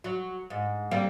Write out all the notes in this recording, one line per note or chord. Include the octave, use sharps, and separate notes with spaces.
F#3
G#2
G3 A#3 C4